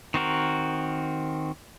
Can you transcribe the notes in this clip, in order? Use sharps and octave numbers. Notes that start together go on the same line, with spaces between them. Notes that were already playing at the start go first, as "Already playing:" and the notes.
D#3 C4 F#4 A#4